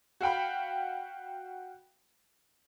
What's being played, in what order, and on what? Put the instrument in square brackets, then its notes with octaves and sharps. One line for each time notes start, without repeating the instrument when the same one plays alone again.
[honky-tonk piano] F#4 F5 G5 B5